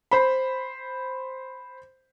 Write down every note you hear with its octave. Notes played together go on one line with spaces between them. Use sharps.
C5 B5